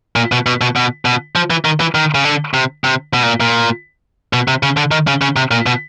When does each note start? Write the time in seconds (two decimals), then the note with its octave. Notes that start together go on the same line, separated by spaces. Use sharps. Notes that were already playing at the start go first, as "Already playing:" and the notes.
0.16 A#2
0.32 B2
0.46 B2
0.61 B2
0.76 B2
1.05 B2
1.36 F3
1.50 E3
1.65 D#3
1.80 E3
1.95 D#3
2.15 C#3
2.25 D3
2.54 C3
2.84 C3
3.13 B2
3.23 A#2
3.40 A#2
4.33 B2
4.48 C3
4.63 C#3
4.77 D3
4.91 D#3
5.07 C#3
5.22 C#3
5.36 C3
5.51 A#2
5.66 B2